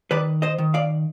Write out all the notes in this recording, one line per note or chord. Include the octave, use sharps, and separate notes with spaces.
D#3 B4 D5
C5 D#5
D#3
D5 F5